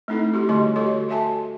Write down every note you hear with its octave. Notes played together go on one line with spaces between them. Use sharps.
A3 C4 D#4 E4 A4
A3 F#4 G4
D3 G3 A3 G4 D#5 C6
F#4 G4 A4 C#5 D#5
F#4 A4 E5 G#5 A5